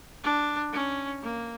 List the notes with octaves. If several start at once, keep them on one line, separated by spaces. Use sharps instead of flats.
D4
C#4
A#3